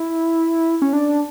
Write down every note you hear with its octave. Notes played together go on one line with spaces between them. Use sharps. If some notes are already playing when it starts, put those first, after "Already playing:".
Already playing: E4
C#4
D4